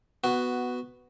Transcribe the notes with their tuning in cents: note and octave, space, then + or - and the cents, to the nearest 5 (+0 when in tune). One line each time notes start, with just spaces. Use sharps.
B3 +5 F#4 +0